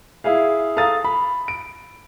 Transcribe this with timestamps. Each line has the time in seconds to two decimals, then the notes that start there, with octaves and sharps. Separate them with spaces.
0.24 E4 G#4 F5
0.77 A4 F5 A#5 D#6 A6
1.04 B5
1.48 D7